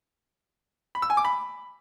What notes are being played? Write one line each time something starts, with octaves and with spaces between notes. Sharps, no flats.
B5
E6
G#5
D6
B5